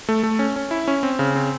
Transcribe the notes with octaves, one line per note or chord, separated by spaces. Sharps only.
A3
A3
C#4
C#4
E4
C#4
C4
C#3
C4